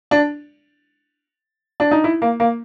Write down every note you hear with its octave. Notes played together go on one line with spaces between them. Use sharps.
D4
D4
D#4
E4
A#3
A#3